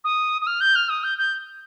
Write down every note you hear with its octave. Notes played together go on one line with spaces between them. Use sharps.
D#6
D#6
F6
G6
F6
D#6
G6
G6